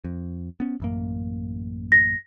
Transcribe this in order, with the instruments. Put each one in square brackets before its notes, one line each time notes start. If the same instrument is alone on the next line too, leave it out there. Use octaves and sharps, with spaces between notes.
[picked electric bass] F2
B3 C#4
A1 F#2 A#3
[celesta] A#6